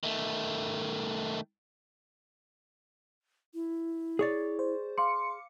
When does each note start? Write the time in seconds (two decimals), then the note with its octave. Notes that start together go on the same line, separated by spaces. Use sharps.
0.03 D#3 A3
3.54 E4
4.19 G#4 C#5 D5
4.59 C5
4.98 F5 C6 D6 C#7